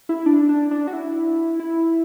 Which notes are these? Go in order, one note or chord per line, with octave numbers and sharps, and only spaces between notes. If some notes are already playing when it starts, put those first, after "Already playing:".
E4
D4
D4
D4
F#4
E4
E4